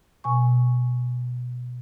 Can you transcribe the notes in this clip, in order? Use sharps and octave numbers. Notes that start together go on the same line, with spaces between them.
B2 G#5 C#6